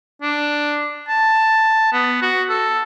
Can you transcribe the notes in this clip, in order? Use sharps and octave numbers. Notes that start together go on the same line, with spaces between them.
D4
A5
B3
F#4
A4